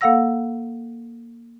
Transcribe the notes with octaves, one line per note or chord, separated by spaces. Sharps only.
A#3 A4 F5 F#5 E6 A#6